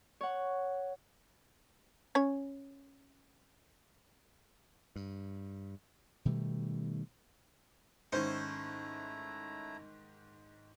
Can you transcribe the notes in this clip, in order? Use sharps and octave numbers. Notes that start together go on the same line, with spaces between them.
C#5 F#5
C#4 C#5
G2
B2 D#3 G3 A3
G#2 D#3 A3 C#4 E4 C5 A#5